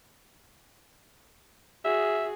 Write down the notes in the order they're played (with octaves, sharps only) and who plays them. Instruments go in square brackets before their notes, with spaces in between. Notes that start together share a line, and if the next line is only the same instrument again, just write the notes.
[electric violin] F#4 G#4 [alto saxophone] E5